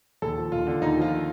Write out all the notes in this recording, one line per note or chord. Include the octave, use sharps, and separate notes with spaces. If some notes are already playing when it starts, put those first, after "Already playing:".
D#2 A4
F3
D#2 F4
D3
D#2 D#4
F3 F4